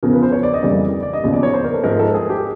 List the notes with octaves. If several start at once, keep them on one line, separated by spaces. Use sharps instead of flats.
E2 C#3 F3 A#4
B4
C5
C#5
D5
D#5
F2 C#3 E3 G3 A#3 D5
D5
D#5
E1 D#2 C#3 F3
D5
C#5
C5
A#4
A4
G#2 F3 A3 A#4
A4
G#4
G4